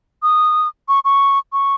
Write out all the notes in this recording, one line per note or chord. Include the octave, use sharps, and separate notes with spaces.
D#6
C#6
C#6
C#6